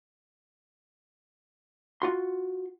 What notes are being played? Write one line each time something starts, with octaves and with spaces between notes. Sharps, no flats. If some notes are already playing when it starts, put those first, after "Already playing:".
F4 F#4 C6